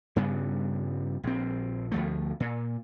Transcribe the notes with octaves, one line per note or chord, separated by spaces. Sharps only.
G2 C#3 G3 B3
A#1 C4
D2 F3 A3
A#2